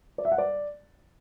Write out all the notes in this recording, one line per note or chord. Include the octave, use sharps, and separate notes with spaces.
D5
E5
F#5
D5